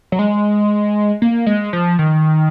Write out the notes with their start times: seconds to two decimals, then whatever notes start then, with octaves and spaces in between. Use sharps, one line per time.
0.12 F#3
0.19 G#3
1.22 A#3
1.46 G#3
1.73 F3
1.99 D#3